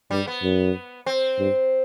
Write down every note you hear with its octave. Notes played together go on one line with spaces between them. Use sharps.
G2 G3
B3
F#2
C4
G2